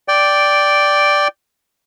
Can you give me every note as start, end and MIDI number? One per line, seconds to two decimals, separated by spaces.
0.08 1.28 74
0.08 1.28 79